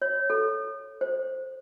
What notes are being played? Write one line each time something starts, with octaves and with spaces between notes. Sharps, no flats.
C#5
A4
C5